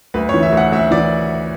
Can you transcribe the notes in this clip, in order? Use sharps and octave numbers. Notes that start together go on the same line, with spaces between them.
D2 B4
C#5
E3
E5
D2
F#5
D2 E5
E3 D5